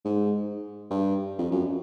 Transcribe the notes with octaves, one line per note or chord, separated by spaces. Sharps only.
G#2
G2
F2
F#2